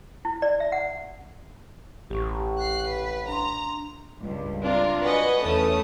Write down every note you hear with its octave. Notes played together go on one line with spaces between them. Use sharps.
E4
D5
E5
F#5
A1 G4 C#6
F#6 C7
B4
D4 A#5 C6
C#2 G2
C4 D4 F4 A#4
F#4 B4 D#5 F#5 G#5
E2 A3 C#4 B4 A5 D#6